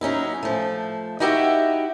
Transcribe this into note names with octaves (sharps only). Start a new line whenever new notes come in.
F#3 C#4 D#4 E4
F3 A3
D#4 E4 F#4 G4 B4 E5